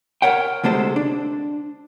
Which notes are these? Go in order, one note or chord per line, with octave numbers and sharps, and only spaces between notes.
A#4 C#5 F#5 G5
D2 C3 G#3 A4 C5
D4